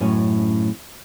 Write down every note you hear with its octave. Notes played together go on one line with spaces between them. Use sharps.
F#2 A2 C#4